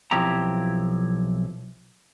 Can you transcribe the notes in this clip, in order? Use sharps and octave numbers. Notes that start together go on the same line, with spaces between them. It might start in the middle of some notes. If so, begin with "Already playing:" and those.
B1 F3 C4 E4 G4 A#5